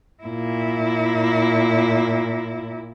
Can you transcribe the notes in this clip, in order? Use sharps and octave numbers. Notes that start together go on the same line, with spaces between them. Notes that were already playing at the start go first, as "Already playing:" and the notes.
A#2 E4